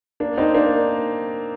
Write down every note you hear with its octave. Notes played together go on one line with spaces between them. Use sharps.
A#3 D4
C4 D#4
A#3 D4